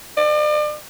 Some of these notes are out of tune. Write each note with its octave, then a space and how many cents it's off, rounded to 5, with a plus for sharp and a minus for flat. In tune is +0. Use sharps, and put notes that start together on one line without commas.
D5 +40